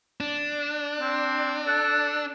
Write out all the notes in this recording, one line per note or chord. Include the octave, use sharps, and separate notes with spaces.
D4
C4
A4 F#6